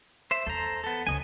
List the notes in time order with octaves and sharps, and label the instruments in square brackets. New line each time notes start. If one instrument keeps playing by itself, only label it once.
[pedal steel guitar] C5 E5
[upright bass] E2 [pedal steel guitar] A4 C5 A#5
[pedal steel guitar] B3 A4
[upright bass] C#2 D3 [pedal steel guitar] C#5 D#5 G#5